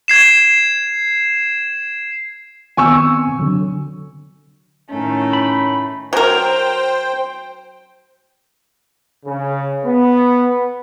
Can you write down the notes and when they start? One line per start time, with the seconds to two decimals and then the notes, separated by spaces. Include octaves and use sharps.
0.08 G#6 C7 E7
2.77 D#3 B3 C4 G#5 C#6 E6
3.39 D3 F#3
4.91 A2 D#3 A3 C#4
5.33 B5
6.13 F#3 A#4 C5 G5
9.25 C#3
9.84 B3